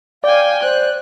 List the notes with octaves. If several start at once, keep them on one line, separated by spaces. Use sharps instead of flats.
D5 F5 G5 G#5
C5 F#6